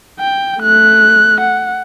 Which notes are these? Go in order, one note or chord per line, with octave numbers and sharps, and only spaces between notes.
G5
A3 F#6
F#5